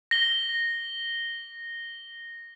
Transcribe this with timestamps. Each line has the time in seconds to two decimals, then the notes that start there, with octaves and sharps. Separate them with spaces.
0.11 A#6 G7